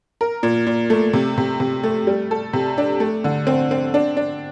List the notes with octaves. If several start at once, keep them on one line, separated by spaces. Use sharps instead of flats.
A#4
A#2
A#2
A3
C3
C3
C3
A3
G3
A4
C3
D4
A3
D3
C4
C4
D4
D4